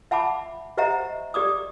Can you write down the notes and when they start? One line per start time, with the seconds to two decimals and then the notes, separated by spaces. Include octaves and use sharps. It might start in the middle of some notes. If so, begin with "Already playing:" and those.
0.11 E5 F#5 A5 B5 D6
0.77 G4 C5 D#5 E5 F#5 A#5
1.34 G4 D5 D6 D#6